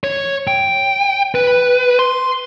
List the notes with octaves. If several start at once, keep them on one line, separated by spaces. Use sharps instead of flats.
C#5
G5
B4
C6